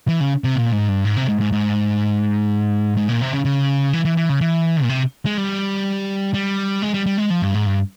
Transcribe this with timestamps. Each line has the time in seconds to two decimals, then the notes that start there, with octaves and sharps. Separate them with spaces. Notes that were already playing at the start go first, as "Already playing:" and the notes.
0.08 E3
0.20 C#3
0.44 C3
0.56 A#2
0.72 G#2
0.88 G2
1.05 G#2
1.16 C3
1.28 G#2
1.40 G#2
1.52 G#2
2.97 G#2
3.09 A#2
3.21 C3
3.33 C#3
3.45 C#3
3.93 E3
4.05 E3
4.17 E3
4.29 C#3
4.41 E3
4.83 A#2
4.89 C3
5.26 G#3
5.37 G3
6.34 G3
6.82 G#3
6.94 G3
7.06 G3
7.18 G#3
7.30 F3
7.42 G2
7.54 G#2
7.66 G2